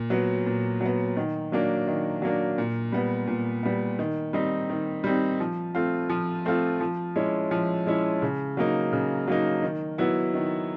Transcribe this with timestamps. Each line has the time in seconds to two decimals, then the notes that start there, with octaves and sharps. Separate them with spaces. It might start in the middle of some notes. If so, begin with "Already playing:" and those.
Already playing: A#2
0.10 F#3 B3
0.46 A#2
0.81 F#3 B3
1.17 D#3
1.52 F#3 A#3 D4
1.88 D#3
2.22 F#3 A#3 D4
2.58 A#2
2.92 G3 B3
3.27 A#2
3.63 G3 B3
3.99 D#3
4.33 G3 C4 D#4
4.70 D#3
5.04 G3 C4 D#4
5.40 F3
5.75 A3 C4 F4
6.10 F3
6.45 A3 C4 F4
6.80 F3
7.16 G#3 C#4 E4
7.51 F3
7.87 G#3 C#4 E4
8.22 C#3
8.57 F#3 A#3 D#4
8.93 C#3
9.27 F#3 A#3 D#4
9.62 D#3
9.98 F#3 B3 E4
10.34 D#3